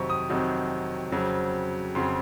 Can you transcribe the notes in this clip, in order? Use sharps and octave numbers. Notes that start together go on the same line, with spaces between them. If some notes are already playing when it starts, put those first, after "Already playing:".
Already playing: F2 C3 D#3 F#3 C4 A#5 C#6
D#6
F2 C3 D#3 F#3 C4
F2 C#3 F#3 C4
F2 C#3 F#3 C4 C6